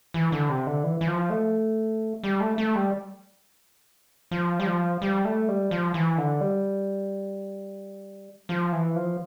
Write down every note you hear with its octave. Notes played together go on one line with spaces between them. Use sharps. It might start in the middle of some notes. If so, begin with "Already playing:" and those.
E3
D3
C3
D3
E3
E3
F3
A3
G3
A3
A3
G3
F3
G3
F3
G3
A3
G3
F3
E3
D3
G3
F3
E3
F3